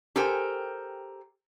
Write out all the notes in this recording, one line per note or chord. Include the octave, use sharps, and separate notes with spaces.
G4 A4 A#4 C5 G5 G#5